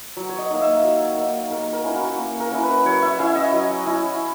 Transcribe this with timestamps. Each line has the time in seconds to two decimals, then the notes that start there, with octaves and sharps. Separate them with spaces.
0.17 F#3
0.29 C#5
0.38 D#5
0.50 A#3 D#4
0.61 E5
0.84 F#3
1.17 A#3 D#4
1.50 A#3 A#4
1.73 A#4
1.84 C#4 E4
1.95 F#4
2.18 A#3
2.40 A#4
2.52 C#4 E4
2.63 B4
2.86 F#3 C#5
3.02 E5
3.19 C#4 E4 E5
3.35 D#5
3.52 F#3
3.86 C#4 E4